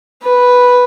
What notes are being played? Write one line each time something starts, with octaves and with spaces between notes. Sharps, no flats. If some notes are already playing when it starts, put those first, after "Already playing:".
B4